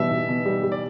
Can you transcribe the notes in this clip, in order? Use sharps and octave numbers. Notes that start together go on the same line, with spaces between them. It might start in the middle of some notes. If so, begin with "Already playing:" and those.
Already playing: B2 E3 G3 E5
B2
B2
G3
G3
D5